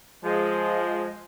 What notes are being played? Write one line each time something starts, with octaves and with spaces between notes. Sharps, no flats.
F3 G#3